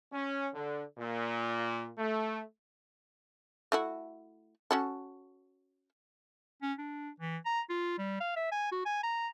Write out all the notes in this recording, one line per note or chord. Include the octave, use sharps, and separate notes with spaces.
C#4
D3
A#2
A3
A3 E4 F#4
C#4 F#4 A4
C#4
D4
E3
A#5
F4
G3
F5
E5
G#5
F#4
G#5
A#5